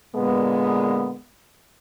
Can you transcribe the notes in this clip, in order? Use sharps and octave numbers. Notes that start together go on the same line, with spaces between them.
A#2 D3 G#3 A#3 B3